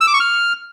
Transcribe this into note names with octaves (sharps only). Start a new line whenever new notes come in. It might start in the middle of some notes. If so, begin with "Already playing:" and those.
E6
D6
C#6
F6